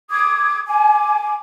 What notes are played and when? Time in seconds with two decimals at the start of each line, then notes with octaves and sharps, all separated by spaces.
0.10 D6 D#6 G#6
0.67 G#5 D6